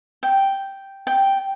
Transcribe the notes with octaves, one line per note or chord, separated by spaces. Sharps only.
G5
G5